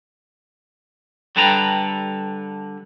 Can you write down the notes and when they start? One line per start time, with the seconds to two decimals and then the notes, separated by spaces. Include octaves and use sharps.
1.36 D3 G3 A4 B4 G5 A#5